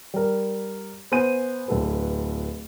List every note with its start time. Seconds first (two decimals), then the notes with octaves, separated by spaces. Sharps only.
0.14 G3 A#4
1.12 B3 C5 G#5 D#7
1.68 D1 A4 B4